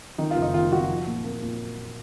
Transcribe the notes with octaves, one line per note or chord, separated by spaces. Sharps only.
D#3 D#4
F4
F#1
D#4
D#3 F4
D#3 F#4
F3
A#2
A#3
A#2